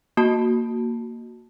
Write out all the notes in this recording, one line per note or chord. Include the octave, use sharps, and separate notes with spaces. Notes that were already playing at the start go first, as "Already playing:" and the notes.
A#3 F#4 A5